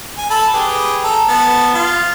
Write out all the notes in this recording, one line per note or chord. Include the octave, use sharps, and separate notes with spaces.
G#5
A4 A5 B5
G4 G#4 B4
A4 A#5
B3 A5
F4